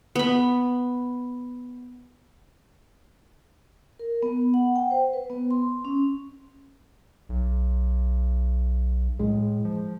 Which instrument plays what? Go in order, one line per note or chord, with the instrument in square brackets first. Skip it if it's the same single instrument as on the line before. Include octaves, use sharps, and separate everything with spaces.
[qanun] B3 B5
[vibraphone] A#4
B3
F#5
G5
C5
B4
B3
C6
C#4
[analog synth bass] B1
[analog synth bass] A2 [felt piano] G#3
[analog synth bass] F3